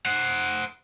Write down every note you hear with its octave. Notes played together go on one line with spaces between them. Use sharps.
C5 F#5